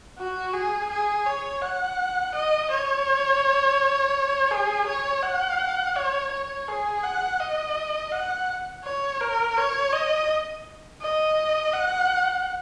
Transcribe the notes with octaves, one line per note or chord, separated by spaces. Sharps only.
F#4
G#4
G#4
C#5
F#5
D#5
C#5
G#4
C#5
F#5
C#5
C#5
G#4
F#5
D#5
F#5
C#5
A#4
C#5
D#5
D#5
F#5